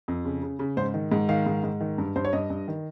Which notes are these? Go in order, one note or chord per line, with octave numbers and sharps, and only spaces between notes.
F2
C#3
C#3
C#3
G#2 C5
D#3
G#2
D#3 F5
G#2
G#2
D#3
G2
G2 C5
C#5
G2 D#5
G2
D#3